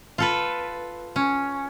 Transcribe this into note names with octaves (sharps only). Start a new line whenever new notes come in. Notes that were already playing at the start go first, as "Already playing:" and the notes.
F4 A4 B4
C#4